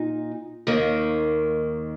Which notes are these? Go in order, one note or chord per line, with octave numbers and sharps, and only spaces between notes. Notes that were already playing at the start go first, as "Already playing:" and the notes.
Already playing: A#2 D#4
D#2 D#3 A#3